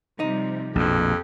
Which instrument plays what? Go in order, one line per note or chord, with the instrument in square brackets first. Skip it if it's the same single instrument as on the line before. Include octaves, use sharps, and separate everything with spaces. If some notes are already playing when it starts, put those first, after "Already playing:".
[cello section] C3 F3 G3 [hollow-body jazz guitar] D#4
[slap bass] A#1 B2 [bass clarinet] F2 [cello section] G4